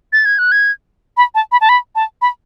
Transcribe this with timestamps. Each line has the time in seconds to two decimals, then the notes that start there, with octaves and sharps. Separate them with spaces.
0.13 A6
0.25 G#6
0.39 F#6
0.52 G#6
1.17 B5
1.35 A5
1.52 B5
1.61 A5
1.69 B5
1.95 A5
2.22 B5